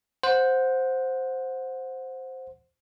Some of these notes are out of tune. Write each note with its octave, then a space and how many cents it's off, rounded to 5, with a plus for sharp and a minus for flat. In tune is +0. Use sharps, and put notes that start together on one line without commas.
C5 +0 F#5 -20